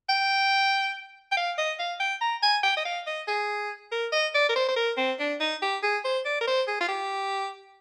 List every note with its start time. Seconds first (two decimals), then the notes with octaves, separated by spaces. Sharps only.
0.09 G5
1.32 G5
1.37 F5
1.58 D#5
1.79 F5
2.00 G5
2.21 A#5
2.43 G#5
2.63 G5
2.77 D#5
2.85 F5
3.07 D#5
3.28 G#4
3.92 A#4
4.12 D#5
4.35 D5
4.49 A#4
4.56 C5
4.68 C5
4.76 A#4
4.97 C4
5.20 D4
5.40 D#4
5.62 G4
5.83 G#4
6.05 C5
6.25 D5
6.41 A#4
6.47 C5
6.68 G#4
6.81 F4
6.88 G4